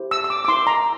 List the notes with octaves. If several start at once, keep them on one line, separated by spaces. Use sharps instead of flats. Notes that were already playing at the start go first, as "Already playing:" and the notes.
Already playing: E4 G4 C5
E6
E6
D6
D6
E4 A#4 C6
A#5